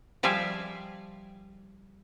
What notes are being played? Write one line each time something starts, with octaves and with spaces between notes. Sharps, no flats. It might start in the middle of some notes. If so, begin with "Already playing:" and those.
F3 G3 E5 F5 G#5